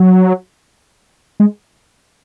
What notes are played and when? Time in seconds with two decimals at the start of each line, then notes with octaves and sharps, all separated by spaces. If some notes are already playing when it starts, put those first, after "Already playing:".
Already playing: F#3
1.40 G#3